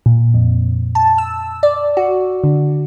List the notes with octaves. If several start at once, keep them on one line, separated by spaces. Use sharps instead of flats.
A#2
F2
A5
E6
D5
F#4
D3